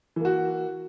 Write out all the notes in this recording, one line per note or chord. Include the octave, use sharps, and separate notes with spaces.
E3 A#3 F#4